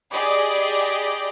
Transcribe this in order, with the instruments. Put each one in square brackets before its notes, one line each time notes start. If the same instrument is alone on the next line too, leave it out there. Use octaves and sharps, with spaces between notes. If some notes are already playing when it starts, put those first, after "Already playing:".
[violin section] G4 G#4 D5 D#5 B5